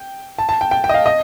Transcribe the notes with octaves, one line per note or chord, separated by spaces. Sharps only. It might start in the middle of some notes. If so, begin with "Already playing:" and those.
Already playing: G5
A5
A5
G5
G5
G5
D#5
F5
D#5